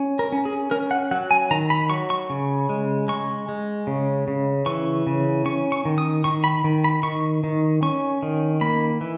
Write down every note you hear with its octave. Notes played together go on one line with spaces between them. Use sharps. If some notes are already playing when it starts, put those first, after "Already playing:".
Already playing: C#4
A#4
C#4
G#4
C#4 A#4
F#5
F#3 F#5
G#5
D#3 A#5
B5
F#3 C#6
C#6
C#3
G#3
G#3 C#6
G#3
C#3
C#3
E3 C#6
C#3
C#4 C#6
C#6
D#3
D#6
D#3 C#6
B5
D#3
B5
D#3 C#6
D#3
C#4 C#6
D#3
A#3 B5
E3